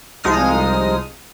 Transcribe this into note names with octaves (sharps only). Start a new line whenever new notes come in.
C2 F3 G#3 D#4 D#6 F6